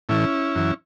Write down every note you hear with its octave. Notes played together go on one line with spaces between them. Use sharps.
A2 E3 C#4 E4
F#2 E3